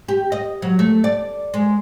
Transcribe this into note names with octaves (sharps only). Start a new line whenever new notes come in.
G4
D#5
F#3
A3
D5
G#3